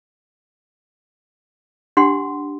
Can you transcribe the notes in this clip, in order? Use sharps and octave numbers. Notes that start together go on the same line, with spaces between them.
D4 G4 F#5 C6